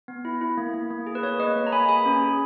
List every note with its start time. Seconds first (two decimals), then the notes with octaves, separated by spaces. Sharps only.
0.08 B3
0.25 E4
0.41 E4
0.58 A#3
0.74 A#3
0.91 A#3
1.07 G#4
1.15 B4
1.23 A#3 C#5
1.39 A#3 B4 D#5
1.56 A#3
1.67 A#5
1.72 A#3 G#5 B5
1.89 G#4 G#5 B5
2.05 C#4
2.22 G#4